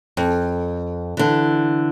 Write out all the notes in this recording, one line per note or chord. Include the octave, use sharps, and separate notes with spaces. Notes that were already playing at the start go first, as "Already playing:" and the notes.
F2
D3 E3